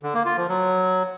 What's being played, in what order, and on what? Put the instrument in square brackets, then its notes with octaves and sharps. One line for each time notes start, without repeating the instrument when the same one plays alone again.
[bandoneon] D3
A#3
F4
F3
F#3